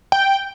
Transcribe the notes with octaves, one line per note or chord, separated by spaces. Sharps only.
G5